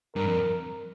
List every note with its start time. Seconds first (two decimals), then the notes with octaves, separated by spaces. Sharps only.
0.15 G2 A#4
0.27 F2